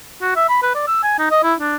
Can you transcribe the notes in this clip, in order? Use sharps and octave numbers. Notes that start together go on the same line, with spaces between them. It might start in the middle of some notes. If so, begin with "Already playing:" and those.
F#4
E5
B5
B4
D5
E6
G#5
D#4
D#5
E4
D4